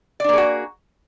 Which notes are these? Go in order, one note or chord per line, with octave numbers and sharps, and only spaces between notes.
A#3 D4 F#4 G#4 D5